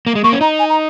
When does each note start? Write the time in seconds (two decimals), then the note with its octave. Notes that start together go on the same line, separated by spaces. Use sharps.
0.07 A#3
0.15 G#3
0.24 A#3 C#6
0.32 C#4
0.41 D#4 A#5
0.59 G#5
0.69 A#5